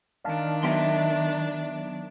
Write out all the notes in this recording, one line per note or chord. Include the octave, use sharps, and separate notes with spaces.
D#3 D4 D5 F5 A5
F#3 B3 E5 G5 C6